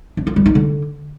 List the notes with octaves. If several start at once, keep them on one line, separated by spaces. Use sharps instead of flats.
D4
F4
G3
D#4
D3